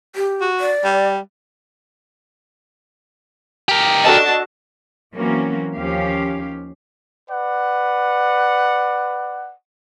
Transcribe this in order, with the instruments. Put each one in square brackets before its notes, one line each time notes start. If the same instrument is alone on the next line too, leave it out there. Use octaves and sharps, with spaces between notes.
[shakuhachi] G4
[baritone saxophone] F#4
[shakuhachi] D5
[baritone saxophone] G3
[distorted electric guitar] G4 A#4
[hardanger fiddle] D4 A5 [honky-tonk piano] F#4 A4 D#5
[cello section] E3 F#3 A#3 C4 C#4 F#4
D#2 F3 C#4 G4 F5
[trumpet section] B4 D5 F#5